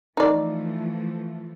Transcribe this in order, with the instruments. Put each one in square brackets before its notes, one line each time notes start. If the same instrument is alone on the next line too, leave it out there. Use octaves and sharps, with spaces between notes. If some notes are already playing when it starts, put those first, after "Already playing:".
[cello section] E3 F3 A3 [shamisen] D#4 D5